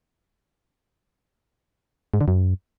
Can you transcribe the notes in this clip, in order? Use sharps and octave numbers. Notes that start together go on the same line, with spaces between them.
G#2
D3
F#2